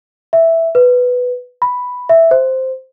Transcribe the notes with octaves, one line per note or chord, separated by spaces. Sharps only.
E5
B4
B5
E5
C5